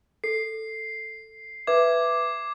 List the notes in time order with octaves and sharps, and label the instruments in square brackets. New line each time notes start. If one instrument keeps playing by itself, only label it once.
[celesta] A4 [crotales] C7
[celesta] B4 E5 [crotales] D6 G#6